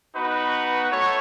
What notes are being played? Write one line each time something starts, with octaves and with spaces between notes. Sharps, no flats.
B3 D#4 F#4 B4
A3 C#5